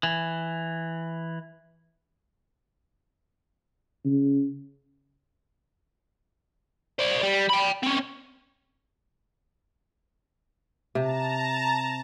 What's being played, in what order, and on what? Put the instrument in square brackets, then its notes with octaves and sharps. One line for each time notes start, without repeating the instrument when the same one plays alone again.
[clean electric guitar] E3
[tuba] C#3
[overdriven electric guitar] C5 D5
G3
G5 B5
C4 C#4
[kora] C3 [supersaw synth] A5 A#5